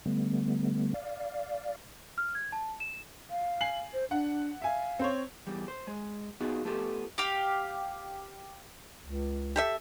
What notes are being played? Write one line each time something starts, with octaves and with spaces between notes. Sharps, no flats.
D3 G3 A3 B3
D5 F5
F6
G#6
A5
E7
F5
G#5 C7 F#7
C5
D4 F#5
E5 F5 G#5
C4 C5 C#5
E2 G3
C5
G#3
B3 D#4 F4 F#4 G#4
A3 B3 F4 G4 A4
G4 F5
C#2
G4 A4 E5